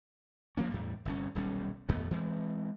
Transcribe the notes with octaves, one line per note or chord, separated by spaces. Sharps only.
F3 A#3 C#4
E2 A2 G3
G1 C2 C#4
D#1 B1 G3 C#4
D#1 F2 A3 B3
E3 G#3 C4